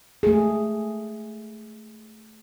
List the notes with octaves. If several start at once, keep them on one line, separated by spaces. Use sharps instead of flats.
A3 G#4